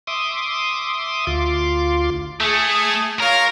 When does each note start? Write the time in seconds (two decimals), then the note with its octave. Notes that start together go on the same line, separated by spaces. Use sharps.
0.07 E5 C6 D6 D#6
1.27 D2 F4 C6 D6
2.41 A3 G#4
3.20 F4 A#4 C#5 F5